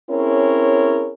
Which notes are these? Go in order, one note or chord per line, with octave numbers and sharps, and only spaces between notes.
C4 C#4 E4 G#4 A#4 C#5